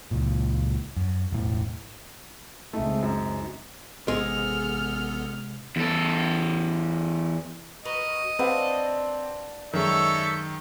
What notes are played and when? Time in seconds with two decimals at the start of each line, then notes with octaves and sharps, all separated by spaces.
0.11 C#2 A#2
0.96 F#2
1.32 E1 A2
2.73 C#2 G#3 A3 C4 D#4
3.03 F#2
4.08 A1 G#2 C3 G#3 B3 A4 F6
5.76 E2 A4
7.85 F#4 A#4 B4 D#5
8.39 C4 D4 B4 F5 F#5
9.73 F#2 D#3 G#3 A4 C#5 E5